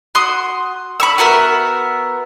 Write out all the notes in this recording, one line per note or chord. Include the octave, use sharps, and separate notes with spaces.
F#4 C6 D#6
B5 C#6 E6
B3 F#4 A#4 E5